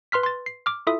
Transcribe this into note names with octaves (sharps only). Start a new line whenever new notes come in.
B4 C6 F6 B6
C6 A6
C7
D6 F6
E4 F4 A4 E5 D#6